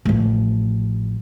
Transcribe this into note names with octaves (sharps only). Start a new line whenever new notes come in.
A1 F3